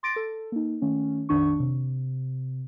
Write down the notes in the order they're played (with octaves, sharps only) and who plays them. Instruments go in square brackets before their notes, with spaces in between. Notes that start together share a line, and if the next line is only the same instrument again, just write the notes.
[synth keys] C6 D6 A6 A#6 D7
A4
A#3 D#4
D#3 A3 C#4
A#1 F2 D#3 D4 C#6
C3